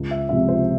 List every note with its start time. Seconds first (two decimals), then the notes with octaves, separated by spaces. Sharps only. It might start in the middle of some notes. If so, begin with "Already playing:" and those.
Already playing: C#2
0.11 E5
0.29 C3 F3 G#3 E5
0.48 C5